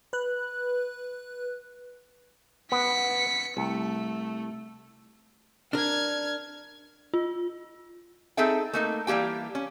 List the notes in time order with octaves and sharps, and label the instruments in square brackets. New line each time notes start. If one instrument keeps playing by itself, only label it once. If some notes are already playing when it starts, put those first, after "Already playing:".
[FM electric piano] B4 F#6
[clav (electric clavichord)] B3 [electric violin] B6 C#7
[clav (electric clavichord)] C2 [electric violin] A3
[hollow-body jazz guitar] D4 A#4 [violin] F6 G#6
[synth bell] F4
[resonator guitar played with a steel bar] C4 D#4 G#4 A4 E5 G5
A3 A#3 D#4
E3 G3 A#3 G4 G5
C#4